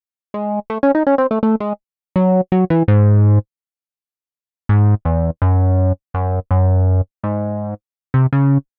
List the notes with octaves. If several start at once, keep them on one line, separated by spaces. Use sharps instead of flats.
G#3
A3
C#4
D#4
C#4
C4
A3
A3
G#3
F#3
F#3
E3
G#2
G#2
E2
F#2
F#2
F#2
G#2
C3
C#3